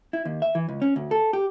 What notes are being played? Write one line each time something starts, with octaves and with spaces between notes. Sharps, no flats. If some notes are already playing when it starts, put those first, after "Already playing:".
E4
D#2
E5
E3
C#2
C#4
D2
A4
G4